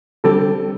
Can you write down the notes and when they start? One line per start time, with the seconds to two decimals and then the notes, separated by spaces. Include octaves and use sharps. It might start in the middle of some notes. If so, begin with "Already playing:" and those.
0.24 D3 G3 C4 G4 A4